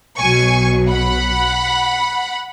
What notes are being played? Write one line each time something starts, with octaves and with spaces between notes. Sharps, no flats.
B1 B2 F#3 G#5 C#6
F#5 B5